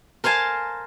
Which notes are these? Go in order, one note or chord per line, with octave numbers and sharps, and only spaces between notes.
A#4 C5 F5 G#5 A5